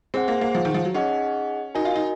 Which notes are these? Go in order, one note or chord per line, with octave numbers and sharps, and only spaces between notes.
C4 G#4 C5 F#5
A#3
A#3
F3
D#3
F3
F#3
C#4 D#4 G#4 D#5 F#5
D#4 F#4 A#4 D#5 G#5
F4
D#4